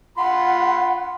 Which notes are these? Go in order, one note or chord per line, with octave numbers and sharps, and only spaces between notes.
F4 F#5 B5 C6